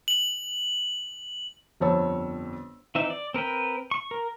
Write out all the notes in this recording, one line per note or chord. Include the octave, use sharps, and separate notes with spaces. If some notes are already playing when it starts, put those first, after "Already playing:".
F#7
G1 F2 C5 C#5 A5 E6
E3 C4 D#4 E5
D5
C4 A#4 B4 G5
C#6
A#4